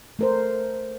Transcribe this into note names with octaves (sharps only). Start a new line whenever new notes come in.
A3 A#4 C5